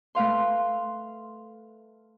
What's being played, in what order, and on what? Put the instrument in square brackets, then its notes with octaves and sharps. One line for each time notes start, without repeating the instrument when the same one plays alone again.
[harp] A3 B4 F5 C6